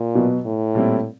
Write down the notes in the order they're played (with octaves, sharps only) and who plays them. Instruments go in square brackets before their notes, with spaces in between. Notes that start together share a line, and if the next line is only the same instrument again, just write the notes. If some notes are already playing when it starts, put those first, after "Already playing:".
Already playing: [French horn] A#2
[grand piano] B2 F#3 B3
[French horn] A2
[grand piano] A#2 G3 C4 E4